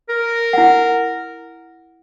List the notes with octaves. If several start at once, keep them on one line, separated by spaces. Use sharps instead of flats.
A#4
E4 F#5